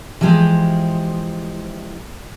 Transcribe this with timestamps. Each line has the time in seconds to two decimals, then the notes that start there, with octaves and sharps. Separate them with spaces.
0.21 E3 F3 G#3 G4 C5